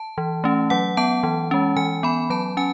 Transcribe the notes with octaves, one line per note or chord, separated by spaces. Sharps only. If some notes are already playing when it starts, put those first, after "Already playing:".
Already playing: A5
E3
A3 C#4
F#3 F#5
B3 A5
E3
G#3 C#4
E3 G#5
B3 B5
F#3 A5
C#4 G#5